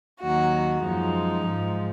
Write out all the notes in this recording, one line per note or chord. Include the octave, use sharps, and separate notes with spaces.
D#2 D#3 F#3 F#4
F#2 F3 G#3 D#4
G#2 F3 G#3